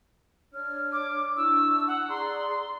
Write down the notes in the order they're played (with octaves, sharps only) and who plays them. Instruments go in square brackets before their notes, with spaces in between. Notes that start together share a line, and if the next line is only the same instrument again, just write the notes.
[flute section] D4 C#5 F6
[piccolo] D6
[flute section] D4 E4 C#6 [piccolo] E6
[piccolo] F#5
[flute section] G#4 D5 A#5 [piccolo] C6